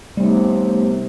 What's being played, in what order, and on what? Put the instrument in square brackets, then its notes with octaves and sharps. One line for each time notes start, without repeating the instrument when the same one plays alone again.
[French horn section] D#2 C3 [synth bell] G3 [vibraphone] A3 B3 D#4